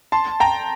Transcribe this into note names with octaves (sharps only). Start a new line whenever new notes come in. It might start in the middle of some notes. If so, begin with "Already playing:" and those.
A5 C6
G5 A#5